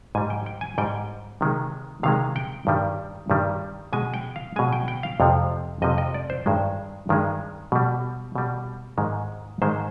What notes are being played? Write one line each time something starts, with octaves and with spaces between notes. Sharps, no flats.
G#2 G3 G#5
G5
G5
G#5
G#2 G3 G5
C3 D#3 G#3
C3 D#3 G#3 F5
G5
G2 D#3 G3
G2 D#3 G3
B2 G#3 G#5
G5
F5
B2 G#3 G#5
G5
G5
F5
F2 C3 F3
F2 C3 F3 D#5
D#5
D5
C5
G2 D#3 G#3
G2 D#3 G#3
B2 G3
B2 G3
G#2 D#3 G#3
G#2 D#3 G#3 C5